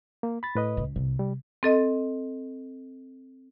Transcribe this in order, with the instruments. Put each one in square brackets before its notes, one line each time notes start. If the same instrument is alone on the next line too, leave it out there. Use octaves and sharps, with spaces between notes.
[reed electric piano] A#3
B5 A6
A2 B4 D#5
[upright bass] C#2
[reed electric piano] C2 [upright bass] C3
[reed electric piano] G3
[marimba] C4 A4 D#5